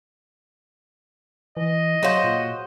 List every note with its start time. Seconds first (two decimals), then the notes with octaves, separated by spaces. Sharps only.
1.57 E3 D#5
2.03 F#3 F#4 G#4 C5 C#5 F5
2.24 A#2